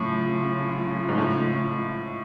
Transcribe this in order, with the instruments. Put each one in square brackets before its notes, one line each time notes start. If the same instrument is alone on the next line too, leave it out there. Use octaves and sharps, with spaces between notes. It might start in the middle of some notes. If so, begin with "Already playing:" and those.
Already playing: [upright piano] A2 [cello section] C#3 F#3 A3 F4
[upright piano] G#2
A2